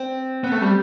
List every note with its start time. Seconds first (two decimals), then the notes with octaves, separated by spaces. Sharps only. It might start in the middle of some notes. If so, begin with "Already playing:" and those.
Already playing: C4
0.44 B3
0.52 A3
0.62 G3